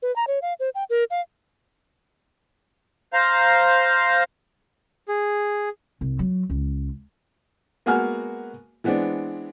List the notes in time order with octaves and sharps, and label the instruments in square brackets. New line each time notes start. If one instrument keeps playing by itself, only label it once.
[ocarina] B4
A#5
C#5
F5
C5
G5
A#4
F5
[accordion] C5 F5 A#5
[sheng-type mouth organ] G#4
[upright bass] C2
F#3
C#2
[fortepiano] G#3 A#3 B3 F#4 G#5 F6
E3 G#3 B3 C4 D4